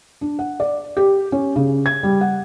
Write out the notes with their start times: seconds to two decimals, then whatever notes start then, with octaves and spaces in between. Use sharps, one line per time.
0.21 D4
0.39 F#5
0.60 D5
0.97 G4
1.32 C#4
1.56 C#3
1.86 G#6
2.03 G3
2.21 F#5